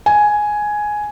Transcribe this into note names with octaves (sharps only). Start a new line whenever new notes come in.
G#5